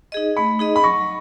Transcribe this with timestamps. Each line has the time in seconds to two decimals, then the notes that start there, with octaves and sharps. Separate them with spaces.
0.12 D#4 G#4 D#5
0.37 A3 B5
0.59 D#4 G#4 D#5
0.76 B5
0.84 F#3 C#6